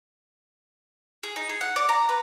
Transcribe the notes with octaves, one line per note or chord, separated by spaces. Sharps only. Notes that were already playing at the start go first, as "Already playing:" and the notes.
G#4
D#4
G#4
F#5
D5
A#5
B4